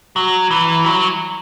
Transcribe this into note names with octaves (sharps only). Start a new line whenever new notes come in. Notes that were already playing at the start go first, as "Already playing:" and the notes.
F#3
E3
F#3